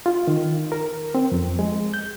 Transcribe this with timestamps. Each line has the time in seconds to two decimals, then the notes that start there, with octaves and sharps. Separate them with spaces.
0.06 F4
0.28 D#3
0.72 A#4
1.15 C4
1.32 F2
1.59 G#3
1.94 G6